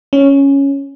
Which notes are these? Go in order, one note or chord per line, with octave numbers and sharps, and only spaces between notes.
C#4